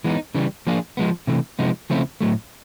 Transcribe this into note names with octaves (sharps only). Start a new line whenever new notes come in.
E3 G#3 B3 D#4
C#3 E3 G3
F3 A#3 D4 F4 G#4
F3 G#3 B3
C3 E3 A3
C3 F3 G#3 B3 D#4
C#3 F3 A3 C4 E4
A2 F#3 A3